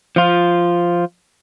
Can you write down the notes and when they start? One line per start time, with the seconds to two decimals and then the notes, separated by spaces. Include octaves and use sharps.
0.16 F3 F4